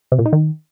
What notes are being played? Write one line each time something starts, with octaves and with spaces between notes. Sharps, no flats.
C3
A#2
D#4
D#3